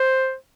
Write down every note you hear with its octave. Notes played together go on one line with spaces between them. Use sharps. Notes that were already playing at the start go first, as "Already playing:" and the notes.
Already playing: C5